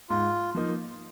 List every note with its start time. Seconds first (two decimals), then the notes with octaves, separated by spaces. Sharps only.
0.10 G#2 F4
0.55 F3 A#3 D#4